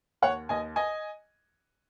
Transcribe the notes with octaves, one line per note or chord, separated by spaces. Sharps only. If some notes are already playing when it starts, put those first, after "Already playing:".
D#2 C#5 F#5
D#2 D#5 G#5
D#5 G#5